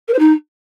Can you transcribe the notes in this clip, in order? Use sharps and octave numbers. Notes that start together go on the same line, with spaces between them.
A#4
C5
D#4